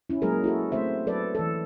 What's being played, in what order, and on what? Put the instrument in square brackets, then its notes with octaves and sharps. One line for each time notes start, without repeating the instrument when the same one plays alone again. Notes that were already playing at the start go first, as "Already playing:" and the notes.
[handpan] C#4 E4
F#3 G#3 A#3 G#4 A#4
E4 F#4 A4
A3 C4 C5 E5
F#3 A4 B4 D5
E3 A4